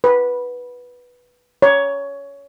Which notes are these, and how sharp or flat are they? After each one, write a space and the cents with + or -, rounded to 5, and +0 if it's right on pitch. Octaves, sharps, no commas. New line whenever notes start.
B4 -10
C#5 +15